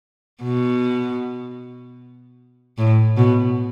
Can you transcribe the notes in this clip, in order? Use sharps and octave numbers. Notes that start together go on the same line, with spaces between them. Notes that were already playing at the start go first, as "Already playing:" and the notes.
B2
A2
B2